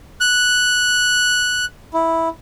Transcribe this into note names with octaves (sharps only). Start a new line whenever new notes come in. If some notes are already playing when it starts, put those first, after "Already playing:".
F#6
E4